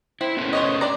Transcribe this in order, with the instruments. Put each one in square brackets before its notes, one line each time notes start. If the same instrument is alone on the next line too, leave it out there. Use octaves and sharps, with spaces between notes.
[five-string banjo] C4 [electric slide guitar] E4
[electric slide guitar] B3 C#4 A4
[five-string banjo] C5 C#5 D#5
D4 D5 A#5